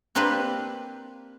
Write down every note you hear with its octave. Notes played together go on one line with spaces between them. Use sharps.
A#3 C4 D4 F4 G4 B4